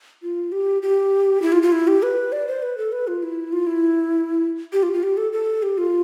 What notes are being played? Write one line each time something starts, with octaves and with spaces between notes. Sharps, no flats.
F4
G4
G4
E4
F4
F4
E4
G4
B4
D5
C5
B4
A4
B4
F4
E4
F4
E4
G4
F4
F4
G4
A4
A4
G4
F4